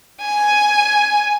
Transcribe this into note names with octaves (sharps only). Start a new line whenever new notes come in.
G#5